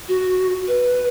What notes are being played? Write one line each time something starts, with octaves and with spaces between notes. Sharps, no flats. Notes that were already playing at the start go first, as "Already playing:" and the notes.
F#4
B4